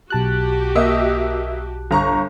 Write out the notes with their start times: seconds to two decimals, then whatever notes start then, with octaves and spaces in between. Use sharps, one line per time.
0.10 B1 F#4 G4 A5 F#6
0.75 A#3 D#5 E5
1.91 G1 A#5 C#6